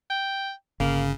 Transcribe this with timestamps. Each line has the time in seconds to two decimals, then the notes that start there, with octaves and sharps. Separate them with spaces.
0.10 G5
0.80 G1 C#3 A#3